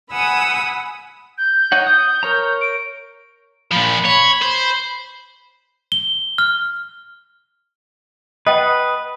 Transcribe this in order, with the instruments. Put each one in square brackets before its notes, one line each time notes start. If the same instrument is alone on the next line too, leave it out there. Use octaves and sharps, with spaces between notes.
[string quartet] F#5 G#5 B5 D#6 E6
[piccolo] G6
[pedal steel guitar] D#4 C#5 F#5
D#6
A#4 C#5 A#5
[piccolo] D7
[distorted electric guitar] A#2 F3 [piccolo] B5
[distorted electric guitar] C#5
C5
[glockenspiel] G7
F6
[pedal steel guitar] B4 [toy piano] D#5 F#5 G5 [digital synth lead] D#6